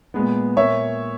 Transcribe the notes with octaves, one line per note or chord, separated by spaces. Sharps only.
A#2 G#3 B3
A#2 A#3 C#5 E5